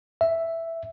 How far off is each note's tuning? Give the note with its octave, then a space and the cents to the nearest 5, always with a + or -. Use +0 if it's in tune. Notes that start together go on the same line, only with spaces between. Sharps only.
E5 +5